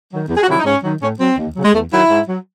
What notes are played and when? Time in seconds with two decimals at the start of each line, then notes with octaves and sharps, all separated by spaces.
0.10 D#3 F#3
0.28 E2
0.36 G#4
0.43 F#4
0.47 C3 D#3 F#3 E4
0.58 D#4
0.64 G#2 C#4
0.82 D#3 F#3
1.01 A2 C#4
1.19 F#3 C4
1.37 D#2
1.55 C#3 F#3
1.63 G#3
1.73 E2 A3
1.91 D#3 F#3 E4
2.10 G#2
2.27 F#3